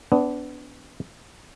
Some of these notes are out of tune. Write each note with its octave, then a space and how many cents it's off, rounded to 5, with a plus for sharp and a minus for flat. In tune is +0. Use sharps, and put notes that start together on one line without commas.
B3 +20 D4 -20